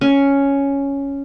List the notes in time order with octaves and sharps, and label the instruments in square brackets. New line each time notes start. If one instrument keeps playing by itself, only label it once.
[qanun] C#4